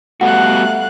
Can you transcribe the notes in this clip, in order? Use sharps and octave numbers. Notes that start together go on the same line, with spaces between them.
G3 A3 B3 F#4 F5 F#5 F#6